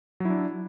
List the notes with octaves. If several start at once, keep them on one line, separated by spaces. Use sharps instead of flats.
F#3 D4 E4